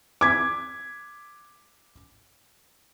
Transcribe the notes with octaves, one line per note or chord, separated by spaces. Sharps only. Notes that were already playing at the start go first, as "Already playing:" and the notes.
D6 G#6 B6